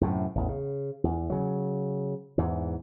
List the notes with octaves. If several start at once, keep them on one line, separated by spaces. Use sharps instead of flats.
F#2 A2 C3
A1 E2
C#3
E2
C#3 F#3
E2 G#2 E3